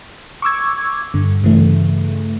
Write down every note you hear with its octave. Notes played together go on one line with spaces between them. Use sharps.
C#6 D6 E6 G#6
G2 D3
G2 C#3 E3 A3